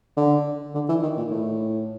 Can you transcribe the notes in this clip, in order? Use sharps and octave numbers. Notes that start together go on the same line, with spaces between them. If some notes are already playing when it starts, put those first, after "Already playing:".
D3
D3
E3
D#3
A#2
A2